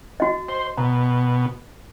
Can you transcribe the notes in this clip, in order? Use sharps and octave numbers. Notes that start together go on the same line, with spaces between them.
F#4 D#5
C5
B2 A#5